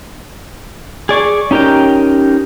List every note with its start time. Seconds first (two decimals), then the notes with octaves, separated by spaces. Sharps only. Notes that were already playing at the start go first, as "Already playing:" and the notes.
1.09 G#4 D5 C#6
1.51 C#4 D#4 G4 A#4 G5